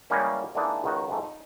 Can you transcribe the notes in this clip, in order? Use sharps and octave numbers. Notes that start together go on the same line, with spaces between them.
C#3 E3 G3 G#3 A#3 C#4
D3 E3 G#3 A#3 D4 D#4
C#2 D#3 F#4
F2 G#2 A3
D#4